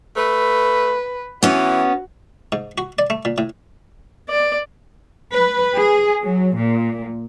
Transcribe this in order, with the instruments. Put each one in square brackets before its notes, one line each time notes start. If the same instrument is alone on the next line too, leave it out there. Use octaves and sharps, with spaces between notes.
[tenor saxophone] A3 [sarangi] B4
[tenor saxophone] E3 [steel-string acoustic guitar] B3 C#4 [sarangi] F#4
[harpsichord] G#2
F#4
D5
A3
A#2
A2
[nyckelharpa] D5
[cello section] B4
G#4
F#3
A#2